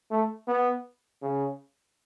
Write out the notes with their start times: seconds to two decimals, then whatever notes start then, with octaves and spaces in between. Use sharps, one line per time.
0.11 A3
0.47 B3
1.22 C#3